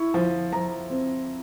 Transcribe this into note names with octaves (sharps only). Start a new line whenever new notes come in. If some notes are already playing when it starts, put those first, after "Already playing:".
Already playing: E4 C#6
F3
F3 A#5
C4